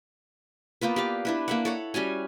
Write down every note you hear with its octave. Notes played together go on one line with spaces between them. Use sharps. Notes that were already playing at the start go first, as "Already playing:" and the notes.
A#3 B3 F4 B4
G4 D5 F5
D4 E4 B4
A#3 E5 F#5
A4 C#5 F#5
G3 C#4 F#4 G#5